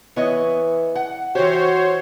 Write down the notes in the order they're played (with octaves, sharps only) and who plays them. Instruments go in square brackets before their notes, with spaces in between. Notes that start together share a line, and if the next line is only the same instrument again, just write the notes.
[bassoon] E3 [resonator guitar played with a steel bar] B3 C#5 D#5
[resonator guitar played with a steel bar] F#5
[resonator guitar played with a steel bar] E3 G4 [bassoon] F#4 [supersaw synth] C5 C#5